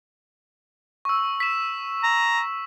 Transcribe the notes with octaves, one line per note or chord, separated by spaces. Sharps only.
C#6 E6
B6 E7
A#5